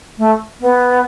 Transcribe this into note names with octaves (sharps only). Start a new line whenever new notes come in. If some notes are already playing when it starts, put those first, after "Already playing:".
A3
B3